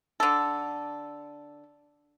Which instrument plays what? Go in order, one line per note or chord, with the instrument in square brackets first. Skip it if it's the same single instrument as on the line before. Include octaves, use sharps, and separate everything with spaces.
[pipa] D3 A4